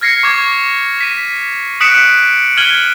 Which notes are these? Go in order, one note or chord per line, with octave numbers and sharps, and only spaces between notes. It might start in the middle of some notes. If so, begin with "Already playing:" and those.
F6 G#6 A#6 C7 C#7
C#6 D6 G#6
B6 D#7
D#6 F#6 B6 C#7 D7 E7
F6 G#6 B6 D#7 F#7 G7